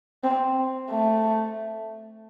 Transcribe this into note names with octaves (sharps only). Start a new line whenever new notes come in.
C4
A3